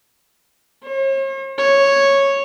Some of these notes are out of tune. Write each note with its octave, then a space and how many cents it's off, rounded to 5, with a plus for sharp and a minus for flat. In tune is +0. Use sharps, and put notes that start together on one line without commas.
C#5 -45
C#5 -5